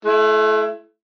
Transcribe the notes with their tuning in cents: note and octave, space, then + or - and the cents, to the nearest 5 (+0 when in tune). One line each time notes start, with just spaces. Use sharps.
A3 -35 E4 +20